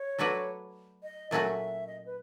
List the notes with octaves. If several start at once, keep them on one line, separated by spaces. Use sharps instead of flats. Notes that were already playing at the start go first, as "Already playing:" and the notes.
Already playing: C#5
F#3 A3 D4 F#4 B4
D#5
A#2 F#3 A3 C#4 F#4 E5
D#5
B4